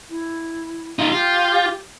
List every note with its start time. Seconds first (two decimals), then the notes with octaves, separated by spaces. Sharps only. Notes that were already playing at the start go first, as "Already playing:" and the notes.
0.09 E4
0.99 D#4 F4
1.12 F4 G4